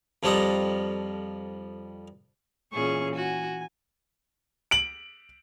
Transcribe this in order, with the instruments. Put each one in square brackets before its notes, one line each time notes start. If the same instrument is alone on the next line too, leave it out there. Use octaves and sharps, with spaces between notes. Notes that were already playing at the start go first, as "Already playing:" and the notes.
[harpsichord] F2 F3 G3 A4 D#5 A#5
[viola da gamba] A#2 E3 G#4 [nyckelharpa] C#4 C#6
[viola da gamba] F#4 [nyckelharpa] G#5
[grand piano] D7 F#7